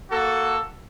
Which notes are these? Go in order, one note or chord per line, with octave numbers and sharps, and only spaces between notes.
A#3 F#4 A4